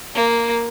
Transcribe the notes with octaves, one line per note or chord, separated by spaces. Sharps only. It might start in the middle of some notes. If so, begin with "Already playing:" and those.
A#3